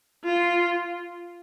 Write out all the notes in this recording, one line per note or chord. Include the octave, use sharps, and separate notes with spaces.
F4